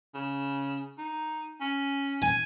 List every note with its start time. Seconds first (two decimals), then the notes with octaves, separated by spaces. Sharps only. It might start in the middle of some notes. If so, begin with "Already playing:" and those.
0.14 C#3
0.98 D#4
1.61 C#4
2.22 G#5